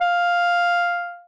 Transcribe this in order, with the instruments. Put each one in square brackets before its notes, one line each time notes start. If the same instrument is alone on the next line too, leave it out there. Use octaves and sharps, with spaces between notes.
[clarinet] F5